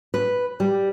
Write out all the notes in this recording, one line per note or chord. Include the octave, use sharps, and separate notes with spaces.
B4
G3